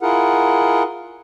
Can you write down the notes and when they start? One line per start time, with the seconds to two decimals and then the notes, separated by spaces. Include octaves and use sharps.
0.01 E4 F4 G#4 A#4 F#5